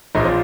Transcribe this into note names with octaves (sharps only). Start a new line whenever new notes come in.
A#1 A#2 F3 D#4
C4